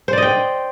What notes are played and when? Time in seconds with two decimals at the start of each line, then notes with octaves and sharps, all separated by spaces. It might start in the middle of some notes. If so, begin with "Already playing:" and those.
0.08 C5
0.13 D5
0.18 D#5
0.22 G5